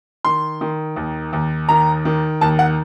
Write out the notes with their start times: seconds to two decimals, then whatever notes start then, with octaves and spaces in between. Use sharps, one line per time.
0.25 D#3 C6
0.61 D#3
0.96 D#2
1.33 D#2
1.69 D#3 A#5
2.05 D#3
2.41 D#2 A5
2.59 F#5